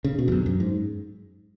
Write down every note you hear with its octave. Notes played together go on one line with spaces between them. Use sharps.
C#3
B2
E2
F#2
F#2
G#2